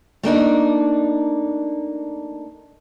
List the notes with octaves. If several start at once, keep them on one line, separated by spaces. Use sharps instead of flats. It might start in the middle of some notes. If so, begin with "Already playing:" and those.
A3 A#3 D4 D#4